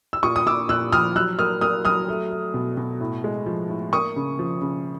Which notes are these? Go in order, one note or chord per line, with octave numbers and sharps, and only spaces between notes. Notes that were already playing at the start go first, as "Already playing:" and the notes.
E6
A#2 C#6 D#6
D#6
A#2 D6 E6
A#2 E6 F#6
F3 D#6 F6
F#3 E6 F#6
A#3 D#6 F6
A#3 D#6 F6
F#3 D#6 F6
A3
A3
B2
B2
A2
G#3
F3
A2
A#3 C#6 D#6
C#3
F3
C#3